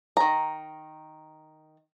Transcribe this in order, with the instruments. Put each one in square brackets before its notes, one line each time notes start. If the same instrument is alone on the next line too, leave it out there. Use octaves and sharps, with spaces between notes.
[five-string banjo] D#3 A#5